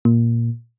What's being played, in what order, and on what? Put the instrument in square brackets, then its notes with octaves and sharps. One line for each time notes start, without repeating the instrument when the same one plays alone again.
[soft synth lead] A#2